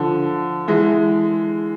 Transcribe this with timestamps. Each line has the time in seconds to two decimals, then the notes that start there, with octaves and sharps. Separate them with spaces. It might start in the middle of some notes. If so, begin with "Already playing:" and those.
Already playing: D3 F3
0.68 E3 G#3